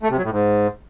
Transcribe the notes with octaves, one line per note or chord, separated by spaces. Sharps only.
A3
C3
F#3
A2
G#2